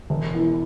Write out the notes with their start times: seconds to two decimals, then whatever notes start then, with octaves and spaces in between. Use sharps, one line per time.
0.10 E1
0.35 E2 E3